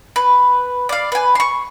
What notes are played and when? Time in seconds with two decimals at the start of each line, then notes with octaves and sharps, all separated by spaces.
0.16 B4
0.89 D5 F5
1.12 B4 G#5
1.35 C6 C#6